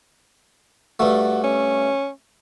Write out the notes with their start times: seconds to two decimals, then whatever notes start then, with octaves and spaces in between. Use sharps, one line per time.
1.00 G2 A3 F#4
1.44 C#4